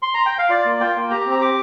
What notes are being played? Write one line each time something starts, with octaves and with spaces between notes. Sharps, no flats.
C6
A#5
G5
F5
F4 D5
A#3
F4 G5
A#3
G4 A#5
A#5
C4
A#5
G4 D6